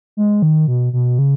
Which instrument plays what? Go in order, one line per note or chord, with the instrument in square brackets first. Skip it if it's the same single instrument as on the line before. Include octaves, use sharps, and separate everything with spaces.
[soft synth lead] G#3
D#3
B2
B2
C#3